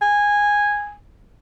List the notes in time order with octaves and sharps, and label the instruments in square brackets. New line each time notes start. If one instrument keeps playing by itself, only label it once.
[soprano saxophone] G#5